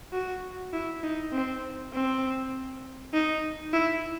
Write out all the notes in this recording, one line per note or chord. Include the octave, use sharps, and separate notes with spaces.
F#4
E4
D#4
C4
C4
D#4
E4